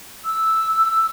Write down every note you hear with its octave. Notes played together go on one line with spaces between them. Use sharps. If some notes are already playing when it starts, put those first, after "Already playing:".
E6